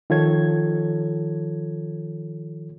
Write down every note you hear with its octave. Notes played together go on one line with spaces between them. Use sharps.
D#3 F3 F4 A4 C#5 G#6